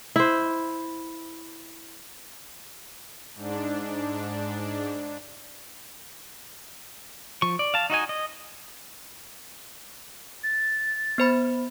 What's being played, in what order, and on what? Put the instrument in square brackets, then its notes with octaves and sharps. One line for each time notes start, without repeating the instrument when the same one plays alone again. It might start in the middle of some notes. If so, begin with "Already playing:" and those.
[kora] E4 C5
[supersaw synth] G#2 D4
[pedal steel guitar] F3 C#6
D5
F5 A5
D#4 F#4 D#5 G#5
D#5
[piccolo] A6
[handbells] B3 C5 B5